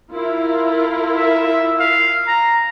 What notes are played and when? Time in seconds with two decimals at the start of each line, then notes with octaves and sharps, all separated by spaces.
0.11 E4 F4 A#4
1.15 E5
1.79 F5
2.27 A#5